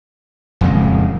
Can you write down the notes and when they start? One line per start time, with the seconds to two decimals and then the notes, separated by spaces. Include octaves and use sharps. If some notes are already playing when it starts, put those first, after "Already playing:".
0.61 D#1 F2 C#3 G#3